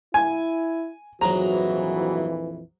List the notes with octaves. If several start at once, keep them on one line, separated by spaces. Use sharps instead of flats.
E4 G#5
A#1 F2 G#2 E3 F#3 F#4 A#5